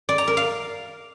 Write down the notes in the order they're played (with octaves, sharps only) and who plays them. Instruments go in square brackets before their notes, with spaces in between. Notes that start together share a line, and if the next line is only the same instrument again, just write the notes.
[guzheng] D5
A#5
A#4
F5